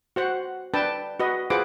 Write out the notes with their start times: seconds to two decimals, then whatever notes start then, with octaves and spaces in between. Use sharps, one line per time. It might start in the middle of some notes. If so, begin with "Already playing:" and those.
0.16 F#4 C5 F#5
0.74 D4 B4 G5 A5
1.20 F#4 B4 D#5
1.50 F4 G#4 B4 C5 F#5 D6